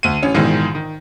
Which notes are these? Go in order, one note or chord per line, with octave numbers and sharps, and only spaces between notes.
D2 D#7
A1 C#4
A#1 G#2 B2 D#3 E3
D#3